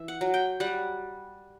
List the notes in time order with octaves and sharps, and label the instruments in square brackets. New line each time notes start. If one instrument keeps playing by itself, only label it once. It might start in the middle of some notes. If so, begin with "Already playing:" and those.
Already playing: [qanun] E3 E5
F#5
F#3
G5
G3 F#5